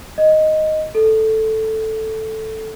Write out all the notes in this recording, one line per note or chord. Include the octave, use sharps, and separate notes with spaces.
D#5
A4